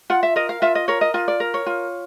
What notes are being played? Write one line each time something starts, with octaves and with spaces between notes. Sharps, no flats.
F4 F#5
E5
A#4 D#5
F5
F4 E5
D#5
A#4 C#5
D#5
F4 D#5
D5
A#4
C#5
F4